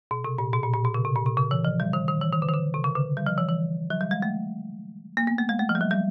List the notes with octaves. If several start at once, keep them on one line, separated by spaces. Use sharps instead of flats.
B2
C3
A#2
B2
A#2
A#2
B2
C#3
C3
A#2
C3
C#3
E3
F3
G3
D#3
D#3
E3
D#3
D3
D#3
D3
C3
C#3
D3
G3
F3
E3
E3
F#3
G3
G#3
A3
A#3
B3
A3
G#3
A3
F3
G3
F#3
G3